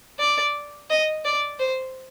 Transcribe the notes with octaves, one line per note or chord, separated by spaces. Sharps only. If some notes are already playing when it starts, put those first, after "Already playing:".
D5
D#5
D5
C5